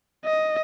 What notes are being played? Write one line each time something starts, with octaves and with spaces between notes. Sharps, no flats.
D#5